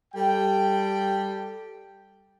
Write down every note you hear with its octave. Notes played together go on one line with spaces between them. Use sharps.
G3 A4 G5